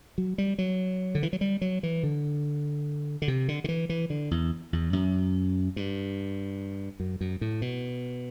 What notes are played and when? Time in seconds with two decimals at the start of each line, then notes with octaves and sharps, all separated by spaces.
0.18 F#3
0.38 G3
0.58 F#3
1.15 D3
1.23 E3
1.33 F#3
1.41 G3
1.61 F#3
1.83 E3
2.03 D3
3.22 D3
3.28 C3
3.48 D3
3.64 D3
3.68 E3
3.89 E3
4.10 D3
4.31 E2
4.73 E2
4.93 F#2
5.76 G2
7.00 F#2
7.21 F#2
7.41 A2
7.62 B2